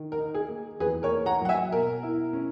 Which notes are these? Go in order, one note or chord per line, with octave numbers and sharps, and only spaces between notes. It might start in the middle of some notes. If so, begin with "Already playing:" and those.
Already playing: D#3
A#4
D#4
G#4
A#3
E2 G#4 B4
A#4 C#5
A#3
F#5 A#5
F#3 F#5
E5 G#5
B2 A#4
E4
C#4